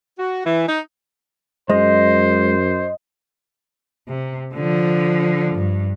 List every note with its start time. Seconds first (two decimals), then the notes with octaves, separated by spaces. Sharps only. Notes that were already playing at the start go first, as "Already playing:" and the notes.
0.19 F#4
0.45 E3
0.68 D#4
1.70 F#2 G#3 C5 D#5
4.08 C3
4.55 D3 F3
5.55 G2